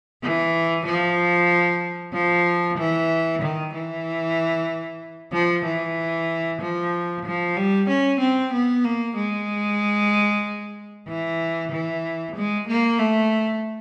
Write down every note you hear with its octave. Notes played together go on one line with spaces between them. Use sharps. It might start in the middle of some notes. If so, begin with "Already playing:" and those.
E3
F3
F3
E3
D#3
E3
F3
E3
F3
F3
G3
C#4
C4
B3
A#3
G#3
E3
E3
G#3
A#3
A3